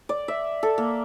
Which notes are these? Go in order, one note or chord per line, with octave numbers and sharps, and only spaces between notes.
D5
E5
A4
A#3